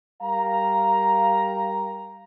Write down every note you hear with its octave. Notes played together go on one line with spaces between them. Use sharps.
G3 A#4 F5 G5 A#5